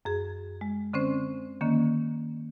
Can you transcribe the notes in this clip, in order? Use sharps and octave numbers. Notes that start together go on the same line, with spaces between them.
F#2 G#4
G#3
D3 C4 C#4 C5
D3 D#3 A#3 C#4